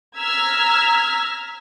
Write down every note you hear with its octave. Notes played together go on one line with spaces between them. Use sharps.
A#5 E6 F6 G#6 B6